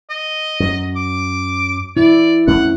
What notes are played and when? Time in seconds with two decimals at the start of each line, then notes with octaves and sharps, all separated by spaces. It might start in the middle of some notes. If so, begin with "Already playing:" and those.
0.10 D#5
0.60 F#2 F#3
0.96 D6
1.97 E4 D5
2.48 F2 A3 C#4 F#5